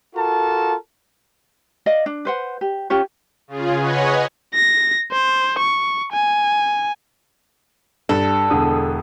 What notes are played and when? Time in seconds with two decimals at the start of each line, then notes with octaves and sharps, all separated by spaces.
0.15 F4 F#4 A4 A#4 A5
1.86 D5 D#5 F5
2.06 D4
2.25 B4 C5 F#5
2.61 G4
2.90 C#4 F4 G4 C#5
3.48 C#3 F4 G#4
3.76 B4 C#5 D#5 F#5 G#5
4.54 A#6
5.12 C5
5.59 C#6
6.12 G#5
8.09 G2 A4
8.50 E1 D3 D#6